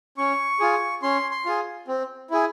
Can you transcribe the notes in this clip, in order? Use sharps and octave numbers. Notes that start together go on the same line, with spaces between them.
C#4 C#6
F4 G#4
C#4 C6
C6
F4 G#4
C4
E4 G#4